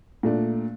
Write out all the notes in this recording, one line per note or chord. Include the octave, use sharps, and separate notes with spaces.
A#2 A3 D4